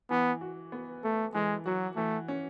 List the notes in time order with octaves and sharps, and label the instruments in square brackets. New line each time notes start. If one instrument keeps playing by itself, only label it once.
[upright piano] E3 [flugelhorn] B3
[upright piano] F#4
B3
[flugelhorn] A3 [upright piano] A4
[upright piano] E3 [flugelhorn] G#3
[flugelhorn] F#3 [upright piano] F#4
[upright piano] E3 [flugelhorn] A3
[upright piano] C#4